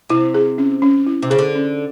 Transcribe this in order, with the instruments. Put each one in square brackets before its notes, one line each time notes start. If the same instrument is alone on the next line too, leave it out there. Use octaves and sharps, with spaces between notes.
[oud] C3 [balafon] E4
[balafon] G#4
C#4
C#4
E4
[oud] C3
[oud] C#3 [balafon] G#4
[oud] D3
[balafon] C#4